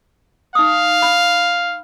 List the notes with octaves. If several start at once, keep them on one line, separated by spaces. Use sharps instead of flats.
D#4 F5 D#6
B5